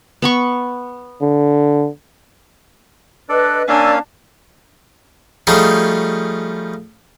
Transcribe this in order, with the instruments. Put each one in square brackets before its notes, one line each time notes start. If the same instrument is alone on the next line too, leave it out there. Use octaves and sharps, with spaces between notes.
[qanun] B3 B5 C#6
[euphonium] D3
[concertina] D4 A4 D5 [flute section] B4 D#5 F#6
[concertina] A#3 C#4 F5 [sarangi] D4 [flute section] D5 G#5 E6
[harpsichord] F3 G3 A3 C#4 D#4 G#4